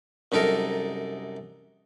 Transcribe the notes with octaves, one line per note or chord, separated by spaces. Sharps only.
C2 F#2 D#4 A4 A#4